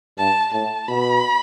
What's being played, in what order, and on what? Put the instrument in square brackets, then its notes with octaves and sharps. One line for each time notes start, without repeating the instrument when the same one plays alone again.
[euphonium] G2 [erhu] A5
[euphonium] A2 [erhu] A5
[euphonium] B2 [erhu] B5